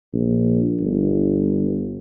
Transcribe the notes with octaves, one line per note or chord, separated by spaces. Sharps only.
A#1
G1